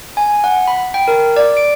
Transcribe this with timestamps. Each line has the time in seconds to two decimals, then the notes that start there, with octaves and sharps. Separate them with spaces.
0.17 G#5
0.44 F#5
0.68 B5
0.94 G5
1.08 A#4
1.37 D5
1.57 D7